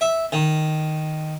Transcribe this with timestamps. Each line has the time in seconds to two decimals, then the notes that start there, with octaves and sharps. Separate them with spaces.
0.01 E5
0.32 D#3